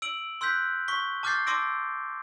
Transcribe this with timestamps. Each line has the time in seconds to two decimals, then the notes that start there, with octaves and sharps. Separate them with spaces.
0.02 E6 D7 F#7
0.41 C6 E6 F#6 G6 B6
0.88 C#6 B6 G7
1.23 A5 D6 F6 G6 A6 C7
1.47 A5 C6 D6 E6 A#6 D7